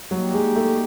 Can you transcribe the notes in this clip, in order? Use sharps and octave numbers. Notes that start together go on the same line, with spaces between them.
F#3 G3 A#3 D#4 G4
G#3
A3